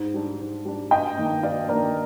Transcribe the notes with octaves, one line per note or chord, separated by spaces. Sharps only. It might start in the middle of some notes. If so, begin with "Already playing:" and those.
Already playing: G#2
G3 D4
G#2
G3 D4
G2 D#5 G5
D#3 A#3 D4
G2 D5 F5
D#3 A#3 D4 A#4 D5